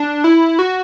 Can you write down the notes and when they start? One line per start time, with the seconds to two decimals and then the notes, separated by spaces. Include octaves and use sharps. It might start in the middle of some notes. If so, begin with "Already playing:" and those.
Already playing: D4
0.24 E4
0.59 F#4